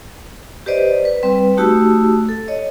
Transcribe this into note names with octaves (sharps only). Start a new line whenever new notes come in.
G4 B4 C5 D5 D#5
B4
G3 C4 B4
A3 D#4 F#4 G4 A5 E6
A4
C#5 D#5